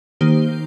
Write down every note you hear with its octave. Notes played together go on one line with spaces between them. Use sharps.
D#3 A#3 D#4 G4 C5